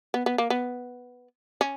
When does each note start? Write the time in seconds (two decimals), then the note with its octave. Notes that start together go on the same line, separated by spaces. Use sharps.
0.14 B3
0.26 B3
0.38 A#3
0.50 B3
1.61 C#4